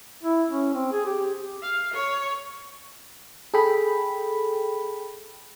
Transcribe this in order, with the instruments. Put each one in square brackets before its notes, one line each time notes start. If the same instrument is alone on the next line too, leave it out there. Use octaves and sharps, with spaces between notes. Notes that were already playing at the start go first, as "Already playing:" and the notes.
[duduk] E4
C#4
C4
G#4
G4
[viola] F5
C#5
[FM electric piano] G#4 A4 G5 B5